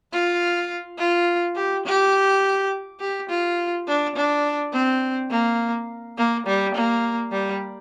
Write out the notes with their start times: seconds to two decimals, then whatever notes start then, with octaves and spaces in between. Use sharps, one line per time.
0.12 F4
0.98 F4
1.56 G4
1.85 G4
3.00 G4
3.29 F4
3.87 D4
4.15 D4
4.73 C4
5.31 A#3
6.17 A#3
6.46 G3
6.75 A#3
7.32 G3